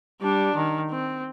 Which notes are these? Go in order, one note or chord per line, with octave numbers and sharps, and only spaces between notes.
G3 D4
D#3
C4